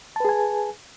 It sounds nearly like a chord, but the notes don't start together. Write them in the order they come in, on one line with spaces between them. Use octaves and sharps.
A5 B4 G#4 G#5